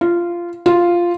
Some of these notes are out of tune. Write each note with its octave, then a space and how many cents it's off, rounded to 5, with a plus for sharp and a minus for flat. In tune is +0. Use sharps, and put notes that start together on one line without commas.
F4 -15
F4 -5